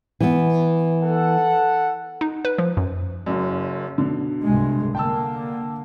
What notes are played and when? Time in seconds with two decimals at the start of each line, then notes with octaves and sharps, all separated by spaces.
0.20 E3 B3
1.03 A4 F#5
2.21 D#4
2.45 B4
2.58 F3
2.77 F#2
3.26 F#1 F#2
3.98 B2 D3
4.46 C2 G2 G#3
4.95 D3 A#3 G5 A5 E6